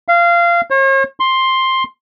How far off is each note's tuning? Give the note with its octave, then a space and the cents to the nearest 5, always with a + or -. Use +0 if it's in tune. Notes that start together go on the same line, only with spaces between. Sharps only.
F5 -20
C#5 -45
C6 +10